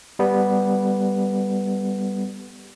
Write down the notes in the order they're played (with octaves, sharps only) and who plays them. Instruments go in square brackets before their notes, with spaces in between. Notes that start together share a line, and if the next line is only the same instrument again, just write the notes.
[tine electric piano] G3 B3